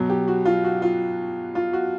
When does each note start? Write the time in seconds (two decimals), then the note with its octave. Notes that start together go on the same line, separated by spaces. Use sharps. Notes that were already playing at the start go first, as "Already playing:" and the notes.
Already playing: B2 F#3
0.10 G4
0.28 F#4
0.45 F4
0.65 F#4
0.82 F4
1.55 F4
1.73 F#4